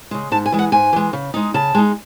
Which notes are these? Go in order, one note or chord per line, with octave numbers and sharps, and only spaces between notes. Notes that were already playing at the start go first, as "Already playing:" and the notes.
C#3 G#3
G#2 A5
G#5
E3 G#3
F#5
G#2 G#5
E3 G#3
C#3
G#3 D#4
C#3 A5
G#3 D#4